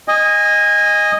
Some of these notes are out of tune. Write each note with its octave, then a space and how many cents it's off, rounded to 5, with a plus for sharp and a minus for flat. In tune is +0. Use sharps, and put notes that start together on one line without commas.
D#5 +0 G#5 -25